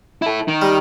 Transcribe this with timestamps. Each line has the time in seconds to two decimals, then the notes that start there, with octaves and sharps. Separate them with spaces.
0.22 E4 A4
0.48 D#3
0.62 G3